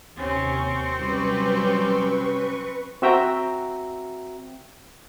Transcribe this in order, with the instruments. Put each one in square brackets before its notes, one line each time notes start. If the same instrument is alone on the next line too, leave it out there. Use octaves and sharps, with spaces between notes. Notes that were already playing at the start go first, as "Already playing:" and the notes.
[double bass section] D#2 C3 [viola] C4 [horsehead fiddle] C#4 [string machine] C#6
[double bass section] C3 F#3 C#4 [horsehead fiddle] G3 [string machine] B4 C#6
[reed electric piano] C4 F#4 E5 G5 A#5